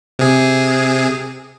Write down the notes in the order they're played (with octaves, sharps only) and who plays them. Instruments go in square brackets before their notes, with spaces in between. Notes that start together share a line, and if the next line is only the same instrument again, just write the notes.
[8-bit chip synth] C3 G#4